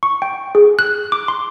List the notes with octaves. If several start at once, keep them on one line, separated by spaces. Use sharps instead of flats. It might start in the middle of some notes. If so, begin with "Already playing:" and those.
C#6
G5
G#4
F#6
D6
C6